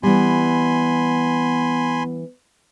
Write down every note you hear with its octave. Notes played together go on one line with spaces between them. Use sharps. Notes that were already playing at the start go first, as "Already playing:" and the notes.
E3 G3 B3 G#5 B5 C6